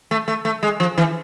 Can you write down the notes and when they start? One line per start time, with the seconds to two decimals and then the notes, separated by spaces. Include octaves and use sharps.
0.11 A3
0.28 A3
0.45 A3
0.63 G#3
0.80 F3
0.98 E3